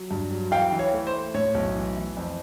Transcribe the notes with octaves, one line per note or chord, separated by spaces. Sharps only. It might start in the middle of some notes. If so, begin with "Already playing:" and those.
Already playing: F#3
G2
F#3
E3 F5 G5
E3
C#5
A3
C5
A3
A2 C#5
B1
E3
E3
F2